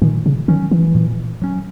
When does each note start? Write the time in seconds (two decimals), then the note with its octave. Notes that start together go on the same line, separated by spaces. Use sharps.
0.02 A#2 D#3
0.26 C#3
0.48 D#3 F#3 C#4
0.71 E3
0.95 A#2
1.42 F#3 C#4